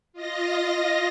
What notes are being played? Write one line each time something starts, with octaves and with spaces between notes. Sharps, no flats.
F4 D#5 A#6